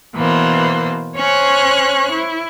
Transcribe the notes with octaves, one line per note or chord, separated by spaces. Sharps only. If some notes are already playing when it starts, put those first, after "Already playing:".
B2 E3 A#3 C5
C#4 C5 C#5 C#6 F#6
E4